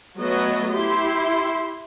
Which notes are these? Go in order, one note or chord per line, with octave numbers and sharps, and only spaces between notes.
F#3 A3 B3 F#4 D#5
E4 G4 C6